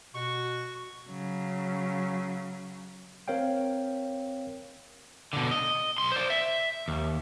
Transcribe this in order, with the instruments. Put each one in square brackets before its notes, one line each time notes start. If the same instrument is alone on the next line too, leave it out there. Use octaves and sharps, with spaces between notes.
[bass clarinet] B2 [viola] F#4 [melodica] C#6
[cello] C#3 F#3
[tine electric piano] C4 A#4 C#5 F5 G5
[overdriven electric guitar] B2 D3
D#5
B1 C6
C5 D5
E5
D#2